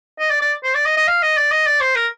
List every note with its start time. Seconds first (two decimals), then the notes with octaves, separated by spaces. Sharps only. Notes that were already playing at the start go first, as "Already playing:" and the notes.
0.19 D#5
0.30 D5
0.41 D5
0.63 C5
0.74 D5
0.86 D#5
0.97 D#5
1.07 F5
1.22 D#5
1.37 D5
1.51 D#5
1.66 D5
1.81 C5
1.95 A#4